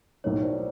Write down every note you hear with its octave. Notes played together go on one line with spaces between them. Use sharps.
B1 A2 F#3 A#3 D#4 C#5
C5 D5